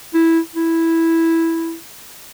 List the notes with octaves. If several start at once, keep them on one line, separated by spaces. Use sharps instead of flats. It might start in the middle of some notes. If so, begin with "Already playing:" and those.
E4
E4